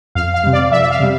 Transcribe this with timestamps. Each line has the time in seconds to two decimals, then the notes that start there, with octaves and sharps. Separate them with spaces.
0.15 F2 F5
0.34 F5
0.44 C3 G3
0.53 D5
0.72 F2 E5
0.82 E5
0.91 F5
1.00 C3 G3